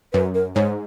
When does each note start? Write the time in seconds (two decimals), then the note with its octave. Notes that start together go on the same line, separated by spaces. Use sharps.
0.13 F#2 B4
0.34 A#4
0.55 G#2 C#5